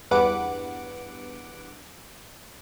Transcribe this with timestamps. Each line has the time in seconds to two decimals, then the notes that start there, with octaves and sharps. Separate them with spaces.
0.11 E2 G2 B4 F#5 D6 D7